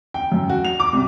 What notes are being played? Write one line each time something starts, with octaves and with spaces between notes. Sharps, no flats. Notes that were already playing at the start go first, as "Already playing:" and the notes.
G5
F#2
F#4
F7
D6
C2